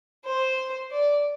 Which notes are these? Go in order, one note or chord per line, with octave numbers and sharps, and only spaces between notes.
C5
D5